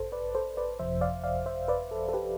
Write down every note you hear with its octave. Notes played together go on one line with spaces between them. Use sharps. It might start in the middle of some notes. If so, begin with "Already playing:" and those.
Already playing: A1 G2 A4 C5
B4 D5
A4 C5
B4 D5
G1 F2 C3 F3 C5 E5
D5 F5
D5 F5
C5 E5
B4 D5
A4
A4
G4 B4